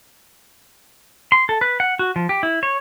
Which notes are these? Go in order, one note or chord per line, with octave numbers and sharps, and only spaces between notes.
C6
A4
B4
F#5
F#4
F3
G4
E4
C#5